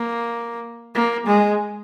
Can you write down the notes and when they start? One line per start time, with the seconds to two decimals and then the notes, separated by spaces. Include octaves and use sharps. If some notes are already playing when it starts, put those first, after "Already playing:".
Already playing: A#3
0.95 A#3
1.27 G#3